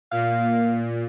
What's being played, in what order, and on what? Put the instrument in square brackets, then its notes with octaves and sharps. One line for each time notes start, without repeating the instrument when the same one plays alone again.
[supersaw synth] A#2 [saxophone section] F5